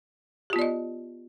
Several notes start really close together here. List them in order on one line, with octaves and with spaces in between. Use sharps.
G4 F4 B3 D5 D#5